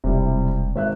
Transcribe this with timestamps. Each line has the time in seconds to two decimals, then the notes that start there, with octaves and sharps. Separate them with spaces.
0.04 E1 C3 G3 E4
0.75 G#1 E5 F#6